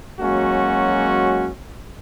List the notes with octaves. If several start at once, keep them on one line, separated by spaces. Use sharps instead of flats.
F#3 G#3 A#3 C#4 F#4